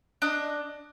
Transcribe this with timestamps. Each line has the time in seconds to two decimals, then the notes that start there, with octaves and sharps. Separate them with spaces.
0.22 D4 D#5